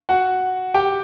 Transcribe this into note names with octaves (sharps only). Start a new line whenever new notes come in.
F#4 F#5
G4 G5